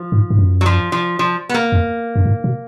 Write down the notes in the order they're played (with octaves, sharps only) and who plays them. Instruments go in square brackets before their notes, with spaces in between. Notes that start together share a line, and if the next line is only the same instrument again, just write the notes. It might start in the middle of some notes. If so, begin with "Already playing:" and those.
Already playing: [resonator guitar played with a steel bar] F3
[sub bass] G#2
G#2
F#2
[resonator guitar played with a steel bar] F#3
F3
F3
F3
B3
A#3
[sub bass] F2
F#2
G#2
B2